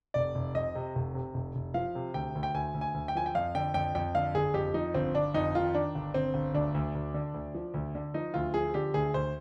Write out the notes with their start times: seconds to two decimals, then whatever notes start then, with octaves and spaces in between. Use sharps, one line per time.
0.14 F1 D5
0.35 F1
0.55 F2 D#5
0.75 C3
0.95 F1
1.14 C3
1.34 F1
1.55 F1
1.74 F3 F5
1.95 C3
2.14 D2 G5
2.35 D2
2.43 G5
2.54 D2 G#5
2.74 D2
2.81 G#5
2.94 D2
3.08 G5
3.15 F3 G#5
3.26 G5
3.35 F2 F5
3.55 D3 G5
3.74 F2 G5
3.95 F2 G5
4.15 D3 F5
4.35 G1 G#4
4.54 F2 G4
4.74 F3 D#4
4.94 G1 C4
5.14 G1 D4
5.34 F2 D#4
5.55 D#3 F4
5.74 D#3 D4
5.95 G1
6.14 G1 C4
6.34 G1
6.54 D2 D4
6.74 D2
6.95 D2
7.14 D3
7.34 D2
7.55 F3
7.74 D2
7.95 D3
8.14 F3 D#4
8.34 D2 F4
8.54 F3 G#4
8.74 D3 G4
8.94 D2 G#4
9.14 D2 C5